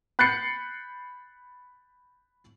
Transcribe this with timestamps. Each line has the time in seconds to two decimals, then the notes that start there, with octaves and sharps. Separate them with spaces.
0.19 B5 F#6 G6 A6 C7 C#7